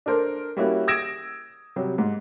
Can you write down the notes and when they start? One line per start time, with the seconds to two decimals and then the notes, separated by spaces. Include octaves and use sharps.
0.06 D4 A4 A#4 C5
0.57 G3 A#3 C#4 E4 F#4
0.87 D#6 E6 G#6 A#6 D7 E7
1.76 C3 F#3 G3
1.98 G#2